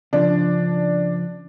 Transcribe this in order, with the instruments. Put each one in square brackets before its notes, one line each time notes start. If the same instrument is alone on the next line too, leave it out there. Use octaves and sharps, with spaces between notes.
[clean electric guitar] C#3 F3 [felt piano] D4